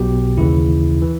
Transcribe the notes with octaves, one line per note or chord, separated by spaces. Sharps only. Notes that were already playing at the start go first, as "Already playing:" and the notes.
Already playing: B1 B2 G4
D#2 C#3 E3 E4
E3